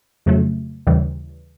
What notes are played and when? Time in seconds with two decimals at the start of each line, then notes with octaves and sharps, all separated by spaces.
0.26 F2 C#3 F#3 A3
0.87 D#2 C#3 E3 G3